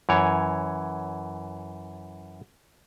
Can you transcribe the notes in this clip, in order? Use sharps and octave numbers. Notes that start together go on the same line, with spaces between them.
F#2 E3 C#5